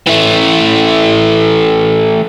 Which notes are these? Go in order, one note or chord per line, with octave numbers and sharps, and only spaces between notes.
E3 A3